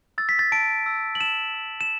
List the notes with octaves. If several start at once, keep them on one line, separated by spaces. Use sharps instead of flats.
E6 A6
B6
A6
A5 D7
E6
F#7
A5 E7
E6
E7